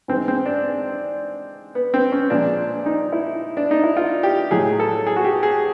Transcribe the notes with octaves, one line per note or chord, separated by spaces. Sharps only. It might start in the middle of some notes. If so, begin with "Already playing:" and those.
G#2 E3 G#3 C4
C4
D4
B3
C4
C#4
A#2 F3 G#3 D4
D#4
E4
D4
D#4
E4
F4
G4
A2 F#3 G#4
A4
G#4
F#4
G4
G#4